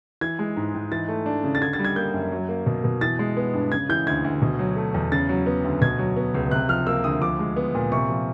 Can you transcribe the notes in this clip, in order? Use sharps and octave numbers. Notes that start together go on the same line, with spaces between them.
E3 G#6
G#3
G#2
G#2
E3 A6
A3
D4
C#3
A6
D3 G#6
A6
G3
G#6
A#3 G6
F#2
F#3
A#3
B2
B2
E3 A6
G#3
B3
G2
C#3 G#6
E3 G6
D2 G#6
D2
B2
F#3
A3
E2
C#3 A6
F#3
B3
D2
B2 G#6
F#3
B3
C#2
C3 F#6
F3 F6
A#3 E6
D2 D#6
F3 D6
G#3
B3
A#2
C3 C#6
F3